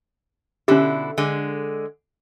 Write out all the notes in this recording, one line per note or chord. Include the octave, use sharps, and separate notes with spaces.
B2 D3 C#4 E4 G4
D3 G#3